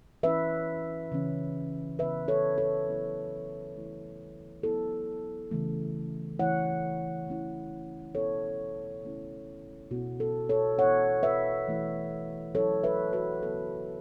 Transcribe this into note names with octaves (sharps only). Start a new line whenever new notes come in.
E3 C#4 E4 B4 E5
C#3 E3 C#4
C#3 E3 B3 E4 B4 E5
A4 C#5
A4 C#5
F#3 B3 E4
E3 A3 E4
F#3 B3 E4 A4
C#3 E3 A3
E3 A3 E4 C#5 F#5
E3 A3 C#4 E4
B2 B3 E4 A4 C#5
C#3 A3 C#4 E4
B2 B3 E4 F#4
A4
A4 C#5
E3 B3 E4 C#5 F#5
B4 E5
E3 A3 E4
F#3 C#4 E4 A4 C#5
B4 E5
F#4 B4
C#3 F#3 B3 A4